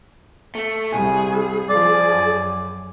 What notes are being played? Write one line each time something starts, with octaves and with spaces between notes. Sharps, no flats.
A3
C2 G3 G#4
F3 D5
F#2